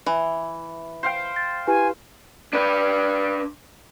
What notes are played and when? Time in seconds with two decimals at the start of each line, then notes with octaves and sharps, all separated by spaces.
0.07 E3 E5
1.03 C5 F5 G5
1.36 A6
1.67 E4 G4 B4 G#5
2.53 D4 B4